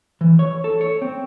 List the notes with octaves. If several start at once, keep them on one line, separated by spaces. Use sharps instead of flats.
E3
C#5
A4
C#5
C4